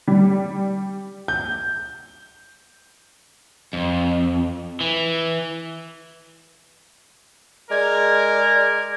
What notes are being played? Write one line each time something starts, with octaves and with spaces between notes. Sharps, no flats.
G3
G6
F2
E3
G#3 A#4 D5 G#6